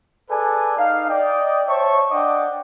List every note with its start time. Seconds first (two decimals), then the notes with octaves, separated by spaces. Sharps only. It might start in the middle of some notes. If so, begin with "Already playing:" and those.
0.29 G#4 A4 B4 D5 G#5
0.76 D#4 F5
1.09 D5 D#5 G5
1.68 C5 C#5 E5 A5 C#6
2.11 D4 D5 D#5 F#5 G5 D6